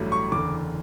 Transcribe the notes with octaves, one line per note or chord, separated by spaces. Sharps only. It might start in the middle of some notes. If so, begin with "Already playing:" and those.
Already playing: A1 G2 F#3 A3
C#6
F#1 E2 D3 D6